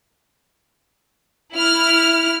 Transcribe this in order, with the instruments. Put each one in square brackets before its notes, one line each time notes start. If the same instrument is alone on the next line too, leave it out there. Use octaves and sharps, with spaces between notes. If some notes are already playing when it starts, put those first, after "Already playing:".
[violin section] E4 F6